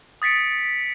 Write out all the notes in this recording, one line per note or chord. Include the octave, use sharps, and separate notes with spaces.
D#6 A6 B6 C#7 D7